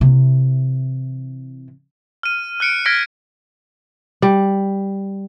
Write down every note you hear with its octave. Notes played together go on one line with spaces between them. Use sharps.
C3 E3
F6 D#7
F6 F#6 C#7 D7
F6 G#6 A#6 B6 C#7 D7
G3